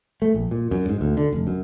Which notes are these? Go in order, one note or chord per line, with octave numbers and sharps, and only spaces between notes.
A3
A#1
A#2
F#2
G#2
D2
D3
F1
F#2